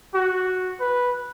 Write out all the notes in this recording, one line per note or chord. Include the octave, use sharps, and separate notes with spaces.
F#4
B4